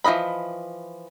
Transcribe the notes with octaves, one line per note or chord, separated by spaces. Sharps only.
E3 F3 D#4 D#5 B5